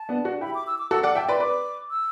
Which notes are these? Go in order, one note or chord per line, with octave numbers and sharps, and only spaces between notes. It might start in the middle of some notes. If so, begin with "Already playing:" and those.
Already playing: A5
B3 D4
D4 F#4
E4 G4 B5
D6
E6
D6
F#4 A4 E6
D5 F#5 D6
E5 G5 A5
B4 D5 C6
B4 D5 D6
E6